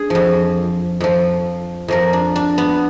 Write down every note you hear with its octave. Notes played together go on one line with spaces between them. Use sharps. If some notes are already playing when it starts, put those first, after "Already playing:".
Already playing: D4 G#4
F2 F3
F2 F3
F2 F3 A#4
D4
D4
B3